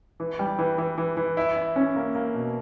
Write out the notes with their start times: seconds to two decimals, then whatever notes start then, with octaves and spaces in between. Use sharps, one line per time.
0.20 E3
0.39 G3
0.59 E3
0.78 E3
0.98 E3
1.17 E3
1.37 E4
1.56 E4
1.76 C#4
1.96 A#3
2.15 A#3
2.34 B2